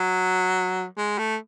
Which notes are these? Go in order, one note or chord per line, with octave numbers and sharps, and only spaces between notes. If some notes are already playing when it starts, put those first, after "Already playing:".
Already playing: F#3
G#3
A3